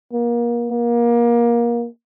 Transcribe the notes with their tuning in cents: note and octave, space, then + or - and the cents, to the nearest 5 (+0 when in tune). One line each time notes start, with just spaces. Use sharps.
A#3 +30
A#3 +25